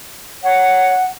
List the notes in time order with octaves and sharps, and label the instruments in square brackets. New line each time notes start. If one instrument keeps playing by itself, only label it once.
[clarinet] C#5 [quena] F#5